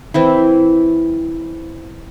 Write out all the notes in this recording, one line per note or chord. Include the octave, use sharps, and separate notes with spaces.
E3 C4 E4